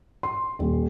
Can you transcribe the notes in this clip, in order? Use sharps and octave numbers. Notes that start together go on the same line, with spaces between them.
C6
D#1